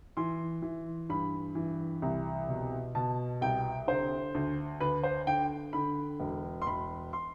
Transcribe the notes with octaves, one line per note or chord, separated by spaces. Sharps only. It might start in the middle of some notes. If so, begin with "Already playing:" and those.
E3 C6
E3
G2 B5
E3
C2
B2
B2 A5
C2 G5
D3 C5
D2
D2 B4
C5
D3 G5
D3 B5
E1
C6
E1 B5
C6